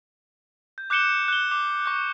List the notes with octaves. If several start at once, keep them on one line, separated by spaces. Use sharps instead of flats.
G6
D6 F#6 G6 C#7 E7 G7
F#6 G7
D6
C#6 F#6